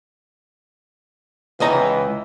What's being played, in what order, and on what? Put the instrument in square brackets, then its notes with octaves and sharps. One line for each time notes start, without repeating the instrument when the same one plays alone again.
[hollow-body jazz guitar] C#2 D#5 A#5 [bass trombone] E3